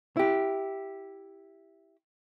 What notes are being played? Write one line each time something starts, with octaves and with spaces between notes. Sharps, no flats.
E4 G4